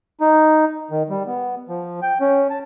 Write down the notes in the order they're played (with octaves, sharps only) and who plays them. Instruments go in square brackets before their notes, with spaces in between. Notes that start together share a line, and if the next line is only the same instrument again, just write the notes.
[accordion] D#4
D#3
G3
B3
F3
G5
C#4
A5